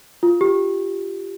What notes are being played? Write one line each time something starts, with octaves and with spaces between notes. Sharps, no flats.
F4
G4